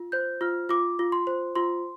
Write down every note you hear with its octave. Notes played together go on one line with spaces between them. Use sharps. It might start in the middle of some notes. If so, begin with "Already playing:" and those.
Already playing: F4
C5 G6
F4 F6
F4 D6
F4
C6
C5
F4 C6